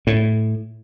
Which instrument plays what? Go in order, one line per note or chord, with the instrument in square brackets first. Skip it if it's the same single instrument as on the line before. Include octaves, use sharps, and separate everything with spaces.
[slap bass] A2